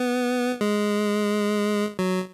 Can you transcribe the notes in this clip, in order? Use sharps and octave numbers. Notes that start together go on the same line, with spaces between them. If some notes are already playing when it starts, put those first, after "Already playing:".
Already playing: B3
G#3
F#3